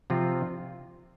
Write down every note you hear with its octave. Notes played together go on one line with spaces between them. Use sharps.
C3 F3 C4 F4